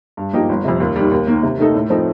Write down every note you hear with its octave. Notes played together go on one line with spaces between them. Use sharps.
G2
F3 A#3 D#4 G4
G1
F2 C3
D#2
D#3 G3
D#2
D#3 A#3
C3
D#3 A3 D#4 A4
A2
F3 C4 D#4 A4